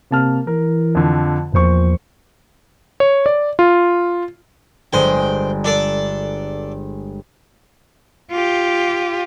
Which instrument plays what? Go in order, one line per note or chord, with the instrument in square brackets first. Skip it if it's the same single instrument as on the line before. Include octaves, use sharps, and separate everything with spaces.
[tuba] C3 [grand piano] A#3 A5 F6
[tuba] E3 [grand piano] A#4
[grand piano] F2 D3
[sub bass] E2 [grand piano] A#2 C5 C#6 [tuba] F3
[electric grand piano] C#5
D5
F4
[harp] G1 G#3 [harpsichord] C5 G5
[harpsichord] D4 A4 D5
[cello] F4 G4